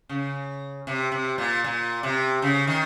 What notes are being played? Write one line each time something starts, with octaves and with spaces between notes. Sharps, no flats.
C#3
C3
C3
A#2
A#2
C3
C#3
D#3